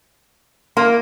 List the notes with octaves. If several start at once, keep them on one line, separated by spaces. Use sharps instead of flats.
A#3 C6